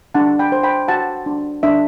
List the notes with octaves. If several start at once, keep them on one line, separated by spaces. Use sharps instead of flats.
D4 F#5 A5
G5 B5
C5
G5 B5
F#4 F#5 A5
D4
D4 E5